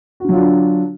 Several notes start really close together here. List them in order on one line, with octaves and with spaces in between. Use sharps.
F#4 D3 F#3 F4 D4